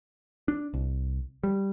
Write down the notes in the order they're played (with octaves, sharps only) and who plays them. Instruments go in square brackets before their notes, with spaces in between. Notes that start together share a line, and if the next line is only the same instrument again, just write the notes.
[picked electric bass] D4
C2
G3